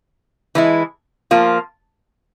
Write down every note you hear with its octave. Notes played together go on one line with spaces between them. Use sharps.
E3 G#3 E4
F3 A#3 F4